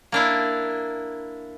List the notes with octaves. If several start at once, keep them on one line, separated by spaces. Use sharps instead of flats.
A#3 D4 E4